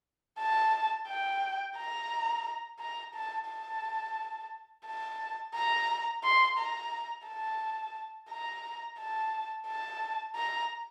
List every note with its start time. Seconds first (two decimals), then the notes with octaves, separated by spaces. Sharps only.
0.39 A5
1.08 G5
1.77 A#5
2.80 A#5
3.15 A5
3.49 A5
4.87 A5
5.55 A#5
6.24 C6
6.58 A#5
7.27 A5
8.31 A#5
8.99 A5
9.68 A5
10.37 A#5